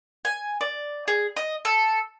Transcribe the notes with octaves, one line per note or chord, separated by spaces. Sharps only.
G#5
D5
G#4
D#5
A4